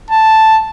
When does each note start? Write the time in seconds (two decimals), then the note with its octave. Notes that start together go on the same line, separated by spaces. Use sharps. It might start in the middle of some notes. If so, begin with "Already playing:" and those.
0.10 A5